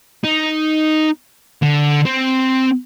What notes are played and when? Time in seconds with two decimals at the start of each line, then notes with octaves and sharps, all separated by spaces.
0.24 D#4
1.63 D3
2.05 C4